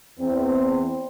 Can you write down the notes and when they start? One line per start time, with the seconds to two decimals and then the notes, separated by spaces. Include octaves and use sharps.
0.19 E2 C4